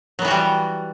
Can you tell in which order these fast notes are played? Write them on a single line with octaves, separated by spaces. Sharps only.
F#3 B3 E3 F#4 G3